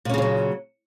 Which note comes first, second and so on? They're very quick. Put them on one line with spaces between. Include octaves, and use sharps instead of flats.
A#2 C#4 C#3 F3 F#3